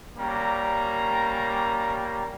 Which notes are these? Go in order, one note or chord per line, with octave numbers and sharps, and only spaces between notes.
G3 A#3 C#4 A#5